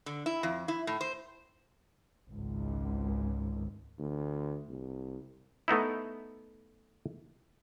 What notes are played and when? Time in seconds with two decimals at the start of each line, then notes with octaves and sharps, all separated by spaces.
0.06 D3
0.26 E4
0.43 F2
0.68 E4
0.87 A2
1.01 C5
2.31 G#1 C#2
3.99 D2
4.69 C2
5.68 A3 B3 D#4 E4